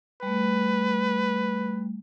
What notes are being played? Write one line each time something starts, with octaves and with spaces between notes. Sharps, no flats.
G3 A3 B4